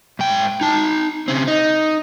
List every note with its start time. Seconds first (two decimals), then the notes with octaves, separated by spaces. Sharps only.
0.19 G#2 G5
0.61 D#4 A5
1.28 C#3 C4
1.48 D#4